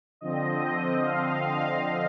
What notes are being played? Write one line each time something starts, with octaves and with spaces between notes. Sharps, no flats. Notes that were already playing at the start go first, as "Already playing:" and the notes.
D3 F3 C4 D#5
F5